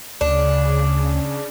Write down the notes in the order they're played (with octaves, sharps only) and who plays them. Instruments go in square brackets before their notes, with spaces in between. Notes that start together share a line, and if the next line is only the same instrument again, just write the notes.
[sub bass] D2 [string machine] C#3 [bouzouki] D4